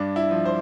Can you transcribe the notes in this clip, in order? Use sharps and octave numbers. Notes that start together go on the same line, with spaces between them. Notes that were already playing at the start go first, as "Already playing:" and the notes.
Already playing: G2 D4
E4
F3
C5